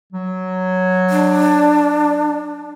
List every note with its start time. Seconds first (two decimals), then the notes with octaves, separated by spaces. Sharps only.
0.13 F#3
1.10 D4